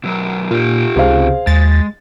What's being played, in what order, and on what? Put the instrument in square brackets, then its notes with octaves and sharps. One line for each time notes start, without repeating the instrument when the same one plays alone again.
[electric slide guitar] B2 F#3 A#4
[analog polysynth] A#2 [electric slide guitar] F4 G4
[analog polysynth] C#2 C3 [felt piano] G#4 C5 F5
[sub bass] D#2 [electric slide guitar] G#3 [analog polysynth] A6